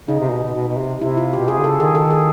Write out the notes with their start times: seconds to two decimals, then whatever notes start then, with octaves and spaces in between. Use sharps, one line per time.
0.08 C#3 D#4
0.20 C3
0.31 B2
0.43 B2
0.55 B2
0.68 B2
0.78 C3
1.01 C3 E4
1.17 F4
1.33 B2 G4
1.48 C3 G#4
1.58 D3
1.64 C#3 A4
1.79 D#3 G#4
1.95 A4
2.11 G#4